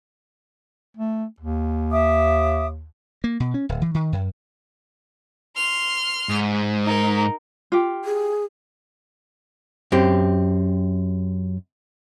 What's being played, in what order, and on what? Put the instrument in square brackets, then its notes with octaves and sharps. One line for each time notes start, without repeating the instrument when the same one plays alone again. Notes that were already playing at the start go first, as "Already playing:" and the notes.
[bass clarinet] A3
D#2
[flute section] E5 D6 D#6
[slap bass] A#3
B2
C#4
D1
E3
D#3
F#2
[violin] C6 F6
[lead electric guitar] G#2
[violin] D#4 A#4
[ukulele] F4 G4
[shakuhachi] G#4
[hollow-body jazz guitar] F#2 C4 G4